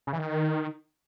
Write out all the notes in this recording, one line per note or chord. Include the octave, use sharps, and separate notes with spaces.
C#3
E3
D#3